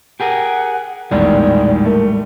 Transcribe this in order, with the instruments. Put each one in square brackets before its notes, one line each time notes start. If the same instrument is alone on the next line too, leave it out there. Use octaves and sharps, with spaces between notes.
[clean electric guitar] G4 G#4 A#4 [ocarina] F#5
[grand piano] A#1 E2 D#3 [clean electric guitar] A2 G3 G#3 [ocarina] D5
[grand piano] A3 [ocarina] A#4